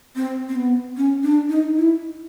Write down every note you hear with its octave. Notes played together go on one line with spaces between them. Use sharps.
C4
C4
B3
C#4
D4
D#4
E4